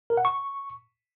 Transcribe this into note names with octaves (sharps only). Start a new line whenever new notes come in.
A#4
F#5
C#6